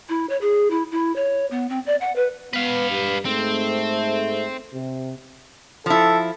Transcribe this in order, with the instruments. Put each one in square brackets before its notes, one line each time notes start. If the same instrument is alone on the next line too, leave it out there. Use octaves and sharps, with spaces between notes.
[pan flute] E4
C#5
G#4
E4
E4
C#5
B3
C4
D5
F#5
B4
[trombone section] B3 [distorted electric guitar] B4 F5
[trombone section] G2
[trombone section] G#2 A3 [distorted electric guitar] C4
[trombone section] C3
[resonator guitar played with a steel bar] F3 E4 [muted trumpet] A4